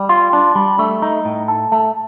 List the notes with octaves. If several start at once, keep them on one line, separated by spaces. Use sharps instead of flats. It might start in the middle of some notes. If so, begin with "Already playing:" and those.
Already playing: G3
F4
D4
G3
A3
D#4
A2
A4
A3